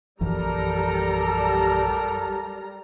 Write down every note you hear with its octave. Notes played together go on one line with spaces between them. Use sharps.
A#1 F#2 E3 G3 A4 A#4 A#5